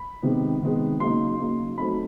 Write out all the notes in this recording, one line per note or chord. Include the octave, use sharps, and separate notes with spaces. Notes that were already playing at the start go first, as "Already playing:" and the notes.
Already playing: B5
C3 D#3 G#3 B3
C3 D#3 G#3 B3
C#3 F#3 A#3 D#4 C6
C#3 F#3 A#3 D#4
F#3 A3 C4 D#4 B5